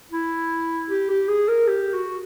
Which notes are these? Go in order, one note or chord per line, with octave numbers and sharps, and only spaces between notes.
E4
G4
G4
G#4
A#4
G4
F#4